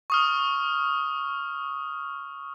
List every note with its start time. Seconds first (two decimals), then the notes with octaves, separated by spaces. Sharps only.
0.10 C#6 D#6 F6